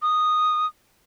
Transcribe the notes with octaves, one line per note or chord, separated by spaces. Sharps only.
D#6